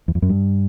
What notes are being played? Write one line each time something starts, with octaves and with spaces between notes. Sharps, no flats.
E2
F2
F#2
G2